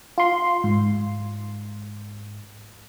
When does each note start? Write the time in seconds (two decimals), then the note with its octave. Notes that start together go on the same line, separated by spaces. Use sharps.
0.18 F4 C6
0.64 G#2